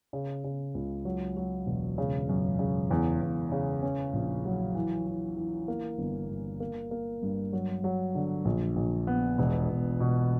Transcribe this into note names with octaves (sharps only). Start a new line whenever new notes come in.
C#3
C#3
C#2
F#3
F#3
E1
C#3
F#2
C#3
E2
E2
C#3
C#4
A#1
F#3
E3
E3
E3
A#3
G1
G2
A#3
A#3
G2
F#3
F#3
D3
A#1
A#1
B3
E1
E1
B2